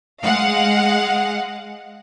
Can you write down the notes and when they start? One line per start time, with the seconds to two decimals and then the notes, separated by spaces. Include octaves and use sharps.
0.22 G#3 F5 F#5